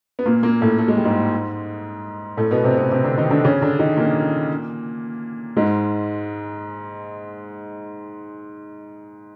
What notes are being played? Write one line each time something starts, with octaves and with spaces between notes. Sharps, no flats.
B3
A#2 A#3
A#2 A#3
A2 A3
A3
G#3
G3
G#2 G#3
A2 A3
B2 B3
C3 C4
B2 B3
C3 C4
D3 D4
D#3 D#4
D3 D4
C#3 C#4
D3 D4
D#3 D#4
A#2 A#3
G#2 G#3